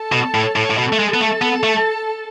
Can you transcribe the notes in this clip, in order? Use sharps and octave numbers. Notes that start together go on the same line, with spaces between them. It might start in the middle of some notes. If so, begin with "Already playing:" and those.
Already playing: A4 A5
B2
A2
A2
A2
B2 A4 A5
A3
G#3
B3
A3
B3
A3